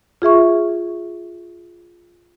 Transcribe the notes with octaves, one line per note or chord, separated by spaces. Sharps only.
F4 G#4 E5 C#6